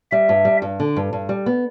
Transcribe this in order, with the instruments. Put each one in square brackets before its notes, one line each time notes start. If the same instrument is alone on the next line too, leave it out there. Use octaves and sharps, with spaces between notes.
[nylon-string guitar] G3 [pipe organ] E5
[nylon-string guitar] G2
G3
G2
D3
G2
G2
G3
B3